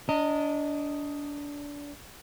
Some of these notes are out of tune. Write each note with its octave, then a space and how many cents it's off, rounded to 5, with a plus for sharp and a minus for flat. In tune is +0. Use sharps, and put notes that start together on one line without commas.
D4 -25 D#5 +0 A#5 -40